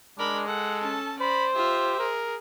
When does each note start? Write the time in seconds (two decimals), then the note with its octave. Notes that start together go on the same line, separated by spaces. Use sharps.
0.19 G#3 D4 A#4 B5
0.48 A4 F#5
0.80 C#4 A5
1.20 C5 D5 B5
1.55 F4 G4 E5
1.99 G#4 A#4